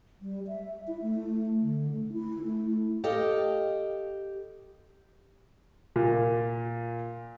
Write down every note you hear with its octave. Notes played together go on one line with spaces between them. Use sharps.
G3
E5
E4
A3
D3
A3
E4
A3
G4 A4 D#5 F5 G5
A#2